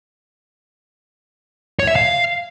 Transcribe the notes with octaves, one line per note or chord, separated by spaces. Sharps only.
C#5
E5
F5